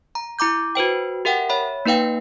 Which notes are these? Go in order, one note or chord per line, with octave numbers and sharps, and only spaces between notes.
A#5
E4 A#5 D6 G6
F#4 B4 C5 G5
G4 A#4 E5 F#5 G5
C#5 E5 B5
A#3 D#4 B4 F5 G5